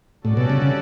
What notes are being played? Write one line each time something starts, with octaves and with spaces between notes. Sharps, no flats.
A2 G3 C#4 F#4 A4 D5
B2
C#3
C#3